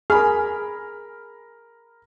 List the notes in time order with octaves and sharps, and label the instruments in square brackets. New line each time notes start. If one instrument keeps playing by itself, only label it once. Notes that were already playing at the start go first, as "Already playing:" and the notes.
[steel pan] G#4 [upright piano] A#4 B5 F6